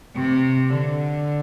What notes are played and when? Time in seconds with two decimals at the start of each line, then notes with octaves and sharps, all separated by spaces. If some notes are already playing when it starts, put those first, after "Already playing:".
0.15 C3
0.73 D3